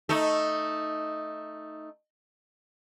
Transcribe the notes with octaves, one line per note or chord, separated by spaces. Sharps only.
A3 D#4